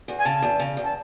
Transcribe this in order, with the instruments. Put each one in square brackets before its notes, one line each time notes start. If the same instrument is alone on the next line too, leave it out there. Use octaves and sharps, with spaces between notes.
[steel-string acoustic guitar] E2
[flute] G#5
[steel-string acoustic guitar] C#3 [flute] A5
[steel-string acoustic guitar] E2
C#3
E2
[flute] A5